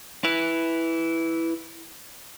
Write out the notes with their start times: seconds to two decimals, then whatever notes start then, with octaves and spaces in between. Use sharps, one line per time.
0.24 E4 B4